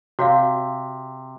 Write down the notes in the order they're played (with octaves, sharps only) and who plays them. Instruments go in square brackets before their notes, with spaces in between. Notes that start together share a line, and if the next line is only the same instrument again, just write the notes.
[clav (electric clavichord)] C3 [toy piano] F#4 C#5 F5